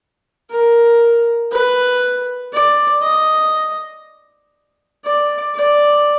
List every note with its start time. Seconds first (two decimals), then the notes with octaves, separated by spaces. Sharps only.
0.51 A#4
1.52 B4
2.53 D5
3.02 D#5
5.05 D5
5.55 D5